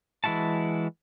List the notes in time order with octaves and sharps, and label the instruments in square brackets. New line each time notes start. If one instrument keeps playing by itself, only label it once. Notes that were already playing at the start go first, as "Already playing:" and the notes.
[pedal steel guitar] E3 G#3 E4 F#4 A5